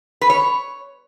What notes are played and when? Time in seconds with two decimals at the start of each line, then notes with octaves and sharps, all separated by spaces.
0.21 B4
0.30 C#5